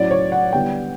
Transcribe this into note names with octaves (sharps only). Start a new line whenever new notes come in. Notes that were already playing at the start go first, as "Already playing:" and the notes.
Already playing: A2 F#3 C#4 E4 D5
C#5
F#5
D3 G3 B3 E4 G5